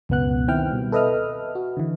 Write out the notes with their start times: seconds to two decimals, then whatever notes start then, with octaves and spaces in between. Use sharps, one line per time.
0.09 C#2 F#2 B2 B3 F#5 F#6
0.48 D#3 C4 E4 G5 F6
0.71 B2 G3
0.92 A4 B4 D#5 E5 D#6 F6
1.55 F#4
1.77 D3 E3